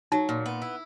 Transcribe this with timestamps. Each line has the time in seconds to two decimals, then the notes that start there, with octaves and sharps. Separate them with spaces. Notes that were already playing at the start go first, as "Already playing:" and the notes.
0.12 F#3 D#4
0.29 A#2
0.46 B3
0.62 E4